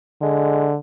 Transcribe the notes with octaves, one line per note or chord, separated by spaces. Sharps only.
D3 G#3